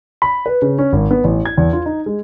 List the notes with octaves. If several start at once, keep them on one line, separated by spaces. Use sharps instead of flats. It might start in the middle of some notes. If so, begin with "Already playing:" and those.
B5
B4
C#3
C#4
G#1
B3
A1
G#6
E2
F4
D#4
G#3